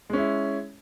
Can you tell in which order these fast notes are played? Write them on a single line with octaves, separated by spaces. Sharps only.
G#3 C#4 E4